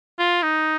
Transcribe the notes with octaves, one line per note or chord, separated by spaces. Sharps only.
F4
D#4